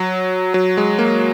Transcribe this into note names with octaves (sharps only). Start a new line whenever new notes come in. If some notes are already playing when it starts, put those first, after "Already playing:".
Already playing: F#3
F#3
G#3
A#3